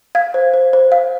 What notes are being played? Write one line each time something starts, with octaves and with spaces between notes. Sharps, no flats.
F5 G#6
C5
C5
C5
F5